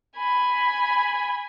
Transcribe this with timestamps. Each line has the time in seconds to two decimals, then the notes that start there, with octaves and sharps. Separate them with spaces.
0.16 G#5 B5